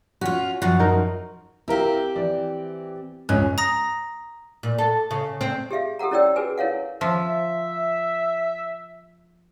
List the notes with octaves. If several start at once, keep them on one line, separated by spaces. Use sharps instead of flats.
C#4 F4 F#4
F#2 F3 F#4
D#4 A#4
C4 E4 G4 A#4 F5
E3 D5
C#2 G#2 C#4 F#6
A#5 D#6 A#6
A#2
A4
C#3
C4
G4 G#4 E5 F5
G4 A4 A#4 F#5 A#5
C#4 E4 C#5 D5 G5 E6
F#4 G#4 A#4 B4 G#5
E4 A#4 C#5 F5 F#5
F3 E5